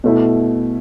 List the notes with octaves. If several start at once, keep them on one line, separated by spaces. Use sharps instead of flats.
B2 A3 E4